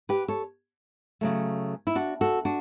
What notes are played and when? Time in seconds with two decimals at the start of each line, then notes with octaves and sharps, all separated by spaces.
0.09 G4 B4
0.28 A4 C#5
1.21 C#3 F#3 A3
1.87 E4
1.95 D4 F#4
2.21 F#4 A4
2.45 D4 F#4